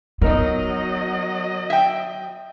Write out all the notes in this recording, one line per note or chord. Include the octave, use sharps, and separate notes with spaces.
F#3 B3 D#4 A#4 D#5
E5 G5